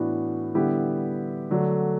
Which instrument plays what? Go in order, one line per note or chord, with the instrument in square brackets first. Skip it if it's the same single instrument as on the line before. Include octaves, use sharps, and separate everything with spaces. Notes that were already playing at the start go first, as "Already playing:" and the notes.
Already playing: [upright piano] A2 E3 B3 D4 F#4
D3 G3 B3 E4 G4
D3 F#3 A3 D4